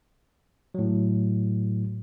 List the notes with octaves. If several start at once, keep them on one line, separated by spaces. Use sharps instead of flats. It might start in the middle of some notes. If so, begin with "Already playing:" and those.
A2 F#3